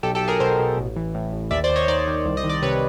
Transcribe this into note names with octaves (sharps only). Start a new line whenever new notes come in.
B1 G4 A4
G4 A4
B1
G#4 A#4
B2 A#4 C5
B2
A1
E3
A2
A1
D#2 D5 E5
C5 D5
D#2
C#5 D#5
D#3 C5 D5
D#3
C2
D#5
D#3
D5
C3 B4 C#5